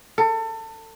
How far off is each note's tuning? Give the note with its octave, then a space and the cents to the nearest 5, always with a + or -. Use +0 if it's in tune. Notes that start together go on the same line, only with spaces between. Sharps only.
A4 +30